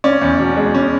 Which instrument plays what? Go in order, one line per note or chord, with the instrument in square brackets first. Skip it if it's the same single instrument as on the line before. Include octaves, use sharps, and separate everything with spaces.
[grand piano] C#4 D5
E2
B2
G#3
C#4